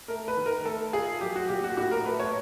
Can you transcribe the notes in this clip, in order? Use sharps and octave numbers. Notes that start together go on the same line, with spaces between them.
A3 A#4
B4
D#3
A#4
A3 A4
F4 G#4
F#3 G4
F#4
A#2 G4
F#4
A2 F#4
A#4
A3 B4
C#5